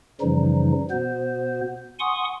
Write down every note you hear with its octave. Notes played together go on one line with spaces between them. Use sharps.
F#2 C#3 E3 F3 G3 D#4
B2 B3 C5
F#5 G#5 C6 C#6 D#6